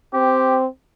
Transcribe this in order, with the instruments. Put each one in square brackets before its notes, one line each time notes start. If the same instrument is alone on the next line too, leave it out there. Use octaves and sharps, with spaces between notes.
[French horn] C4 [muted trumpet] G4